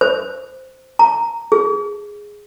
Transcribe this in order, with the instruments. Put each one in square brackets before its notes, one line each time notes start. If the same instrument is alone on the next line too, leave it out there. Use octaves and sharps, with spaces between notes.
[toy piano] C5
A#5
G#4